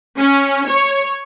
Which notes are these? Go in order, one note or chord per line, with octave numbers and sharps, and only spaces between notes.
C#4
C#5